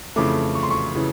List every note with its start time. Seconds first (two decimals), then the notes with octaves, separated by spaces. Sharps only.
0.16 F2 C#3 E3 A3 D6
0.55 C#6
0.63 C6
0.71 C#6
0.95 C#3 E3